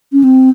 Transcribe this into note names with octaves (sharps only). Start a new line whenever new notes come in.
C#4
C4